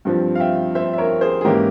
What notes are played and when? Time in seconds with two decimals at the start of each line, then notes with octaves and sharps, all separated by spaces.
0.05 G2 F3 C4
0.35 F5
0.40 E5 G5
0.75 C5 E5
0.93 E5
0.98 A#4 C#5
1.21 G#4 C5
1.41 G#4
1.44 G#2 E3 A#3 C#4 E4 G4 A#4